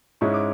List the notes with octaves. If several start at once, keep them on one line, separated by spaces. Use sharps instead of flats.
G#2 G#3 C#4 E4 C#6
D6